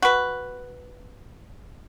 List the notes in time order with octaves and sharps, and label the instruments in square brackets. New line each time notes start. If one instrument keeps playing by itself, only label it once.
[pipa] F#4 B4